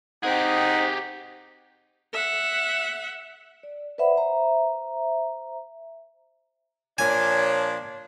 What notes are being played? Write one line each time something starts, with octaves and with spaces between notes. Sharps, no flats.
C4 D#4 G4 G#4 F#5
E5 F#5
D5
B4 C5 D5 E5 F#5 B5
C5 E5 A#5
A#2 F3 D4 C#5 G#5